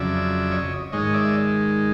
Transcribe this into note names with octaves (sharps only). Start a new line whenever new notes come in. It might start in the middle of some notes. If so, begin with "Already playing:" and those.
Already playing: F2 C#3 F#3 D5 E5
C#5 D#5
G#2 D#3 G#3 C#5 D#5
D5 E5